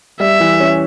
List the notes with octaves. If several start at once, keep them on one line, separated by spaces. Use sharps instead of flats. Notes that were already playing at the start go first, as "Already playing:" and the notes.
G3 E5
E3
C#4